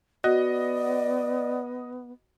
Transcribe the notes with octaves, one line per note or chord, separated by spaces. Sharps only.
B3 F#4 D5 D#5 F#5